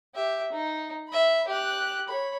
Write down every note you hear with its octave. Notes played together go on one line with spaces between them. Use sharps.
G4 E5
D#4
E5 B5
G4 F#6
C#5 B5